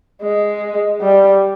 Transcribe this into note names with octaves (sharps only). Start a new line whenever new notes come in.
G#3
G3